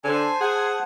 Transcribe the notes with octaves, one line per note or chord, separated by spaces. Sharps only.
D3 C5 G#5 A5
G#4 F#5